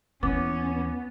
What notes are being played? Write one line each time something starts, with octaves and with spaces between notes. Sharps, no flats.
D#2 E3 B3 C#4 D6